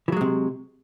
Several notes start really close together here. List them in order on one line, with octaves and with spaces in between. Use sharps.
E3 F#3 G#3 C3